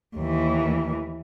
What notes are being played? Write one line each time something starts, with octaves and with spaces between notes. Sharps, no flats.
D#2 E3